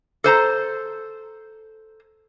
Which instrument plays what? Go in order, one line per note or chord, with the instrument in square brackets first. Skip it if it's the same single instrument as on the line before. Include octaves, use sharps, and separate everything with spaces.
[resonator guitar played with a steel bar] A4 C5 A#5